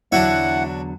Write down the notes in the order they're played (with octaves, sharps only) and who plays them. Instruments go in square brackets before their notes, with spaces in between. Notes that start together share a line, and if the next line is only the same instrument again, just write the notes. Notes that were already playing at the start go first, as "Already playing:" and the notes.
[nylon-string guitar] E2 D3 F#3 [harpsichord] D4 F#4 C#5 [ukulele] E4 [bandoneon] F#5